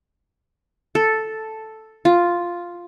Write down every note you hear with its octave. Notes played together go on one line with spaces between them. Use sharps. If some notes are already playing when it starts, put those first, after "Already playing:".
A4
F4